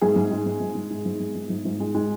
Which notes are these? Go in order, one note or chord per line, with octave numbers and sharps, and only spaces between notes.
G#2 G#4
G#2
G#3
G#2
G#2
G#2
G#3
G#2
G#2
G#2
G#2
G#2
G#3
G#3